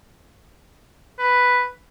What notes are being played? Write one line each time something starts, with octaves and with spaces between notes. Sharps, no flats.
B4